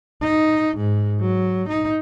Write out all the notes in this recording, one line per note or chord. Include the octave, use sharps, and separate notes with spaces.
D#4
G#2
F#3
D#4